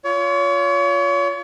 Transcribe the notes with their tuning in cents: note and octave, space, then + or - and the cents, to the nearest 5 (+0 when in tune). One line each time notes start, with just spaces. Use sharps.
F4 +0 C#5 +35